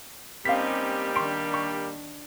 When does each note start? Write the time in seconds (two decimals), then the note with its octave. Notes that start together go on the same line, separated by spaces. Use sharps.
0.45 G3 A#3 C4 C#4 D#4 G4 F5 B6
1.16 D#3 D4 C6 C#6 D7
1.54 C#6